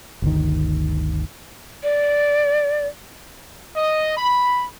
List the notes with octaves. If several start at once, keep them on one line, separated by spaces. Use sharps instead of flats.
G1 D2 D#3
D5
D#5
B5